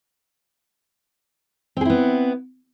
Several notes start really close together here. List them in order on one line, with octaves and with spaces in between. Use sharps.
C4 G#4 E4 B3